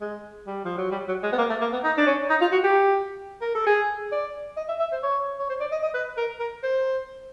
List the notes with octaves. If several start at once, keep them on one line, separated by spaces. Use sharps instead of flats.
G#3
G3
F3
F#3
G3
F#3
G#3
B3
A#3
A3
A#3
B3
D#4
D4
C#4
D#4
F4
F#4
G4
A#4
A4
G#4
D5
D#5
E5
E5
C5
C#5
C#5
C5
D5
D#5
D#5
B4
A#4
A#4
C5